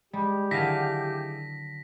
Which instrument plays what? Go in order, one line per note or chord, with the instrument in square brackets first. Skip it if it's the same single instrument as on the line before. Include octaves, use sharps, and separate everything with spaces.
[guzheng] G3 [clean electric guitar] G#3 [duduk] G4
[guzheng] D3 D#3 F#3 [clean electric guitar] E4 G#4 F5 [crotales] A#6 B6